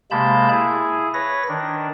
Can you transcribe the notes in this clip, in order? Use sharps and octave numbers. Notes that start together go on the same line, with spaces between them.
C3 G#3 A#3 A5 B5 G6
E4 G#4
B4 C#5 A#6
D#3 D4